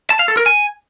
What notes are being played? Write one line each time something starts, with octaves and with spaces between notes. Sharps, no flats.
A5
F5
A4
A#4
G#5